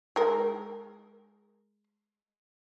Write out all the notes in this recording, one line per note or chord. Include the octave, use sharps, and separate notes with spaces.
G#3 A#4